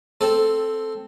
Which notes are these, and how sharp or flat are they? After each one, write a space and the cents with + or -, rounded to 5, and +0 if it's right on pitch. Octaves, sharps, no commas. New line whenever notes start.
C4 +0 A4 +0